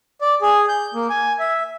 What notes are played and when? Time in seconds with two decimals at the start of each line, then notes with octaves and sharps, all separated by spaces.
0.21 D5
0.42 G#4
0.69 G6
0.94 A#3
1.10 G#5
1.39 E5